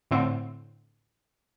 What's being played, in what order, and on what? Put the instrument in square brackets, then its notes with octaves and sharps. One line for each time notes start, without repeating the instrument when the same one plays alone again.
[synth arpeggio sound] A2 D3 C4